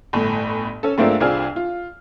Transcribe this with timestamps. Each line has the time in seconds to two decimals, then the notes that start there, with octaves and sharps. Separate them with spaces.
0.13 G1 A2
0.83 C#4 A4
0.98 G#2 A3 A#3 C4 D4 F4
1.20 C2 C4 D4 F4 G#4 F6
1.56 F4